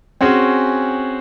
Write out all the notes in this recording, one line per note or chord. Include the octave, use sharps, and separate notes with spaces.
C4 C#4 F#4 G#4